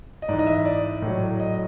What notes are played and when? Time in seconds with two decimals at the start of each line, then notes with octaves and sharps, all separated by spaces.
0.22 D#5
0.28 G#2 E3 D5
0.39 D#5
0.47 E5
0.65 D5
1.02 A2
1.07 F#3
1.40 D#5